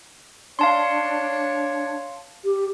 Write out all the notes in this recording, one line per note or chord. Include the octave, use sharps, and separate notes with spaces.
D4 C#5 F5 A5 C6
G4